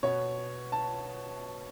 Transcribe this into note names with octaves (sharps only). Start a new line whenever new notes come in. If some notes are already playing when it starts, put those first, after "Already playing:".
B2 B3 C#5
A5